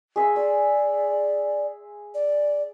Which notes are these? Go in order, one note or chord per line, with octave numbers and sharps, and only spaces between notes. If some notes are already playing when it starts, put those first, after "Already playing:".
G#4 E5 C6
D5 E6
D5